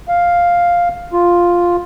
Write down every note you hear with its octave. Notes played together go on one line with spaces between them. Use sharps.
F5
F4